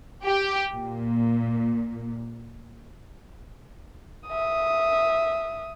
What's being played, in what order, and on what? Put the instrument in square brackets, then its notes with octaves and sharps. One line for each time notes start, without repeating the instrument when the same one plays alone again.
[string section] G4
A#2
[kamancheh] E5 D#6